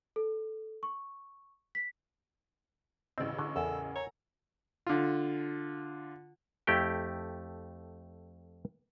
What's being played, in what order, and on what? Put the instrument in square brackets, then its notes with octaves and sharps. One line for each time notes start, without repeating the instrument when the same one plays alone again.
[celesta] A4
C#6
B6
[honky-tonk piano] A1 C#3 E6 [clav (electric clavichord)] C4 D5 [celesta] D#5
[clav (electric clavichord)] D3 [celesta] C#6
[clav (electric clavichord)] E2 [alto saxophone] A4 [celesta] A#4 F#5 G#5
[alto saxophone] C#5 [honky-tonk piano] A#5
[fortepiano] D3 F4
[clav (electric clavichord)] F2 A3 E4 G4 G5